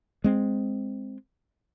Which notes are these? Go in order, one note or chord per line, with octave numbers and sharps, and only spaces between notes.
G#3 C4